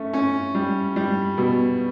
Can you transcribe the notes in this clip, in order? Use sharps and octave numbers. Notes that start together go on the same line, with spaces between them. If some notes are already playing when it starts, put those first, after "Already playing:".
Already playing: A3 C#4
C#4
G3
G3
B2